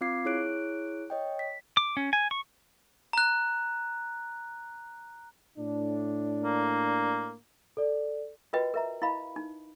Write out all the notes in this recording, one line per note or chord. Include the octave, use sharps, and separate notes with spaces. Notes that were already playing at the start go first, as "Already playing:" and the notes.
C4 F4 F5 D6 G#6 C7
E4 G#4 C#5 F#6 D7
C#5 D#5 G5
B6
D6
C#4
G#5
C#6
A#5 F#6
A2 D4
A#3
A4 D5
F4 F#4 A#4 B4 D#5 G5
A#4 E5 A#5
E4 D#5 F5 B5
D#4